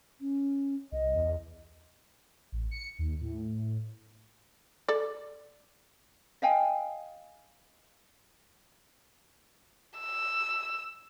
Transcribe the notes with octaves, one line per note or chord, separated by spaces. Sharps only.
C#4
C2 D#5
E2
A1
C#7
D#2
A2
A4 D5
D#5 F5 G5 G#5
E6